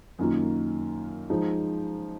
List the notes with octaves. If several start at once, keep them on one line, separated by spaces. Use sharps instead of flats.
F#2 D#3 A#3 F4
F3 G#3 D#4